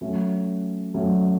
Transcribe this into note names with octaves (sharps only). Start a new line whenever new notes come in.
F#3 A3 C#4
F#3 A3 C#4